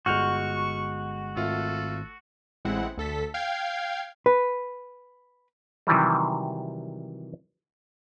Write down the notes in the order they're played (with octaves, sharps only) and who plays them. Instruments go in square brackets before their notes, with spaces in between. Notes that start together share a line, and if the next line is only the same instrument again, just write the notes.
[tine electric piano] G1 G#3 [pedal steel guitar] F#4 [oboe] C#6 [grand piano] F6 G6 F7
[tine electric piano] G#1 [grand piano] A3 F4 [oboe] A4
[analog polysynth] A1 G#3 C4 E4 F#5
D2 A4 B6
F5 G5 G#6 C7
[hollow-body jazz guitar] B4
[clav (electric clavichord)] C3 D#3 E3 F#3 G3